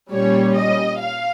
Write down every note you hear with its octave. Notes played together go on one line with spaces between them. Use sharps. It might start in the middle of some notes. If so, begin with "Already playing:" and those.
A#2 G3 C#4 C#5
D#5
F5